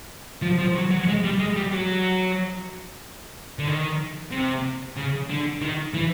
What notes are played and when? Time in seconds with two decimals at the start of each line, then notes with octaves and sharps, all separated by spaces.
0.42 F3
0.58 F3
0.76 F#3
0.91 F#3
1.07 G#3
1.24 G3
1.39 G#3
1.56 G3
1.73 F#3
3.59 D3
3.68 D#3
4.31 C3
4.97 C#3
5.30 D3
5.62 D#3
5.94 E3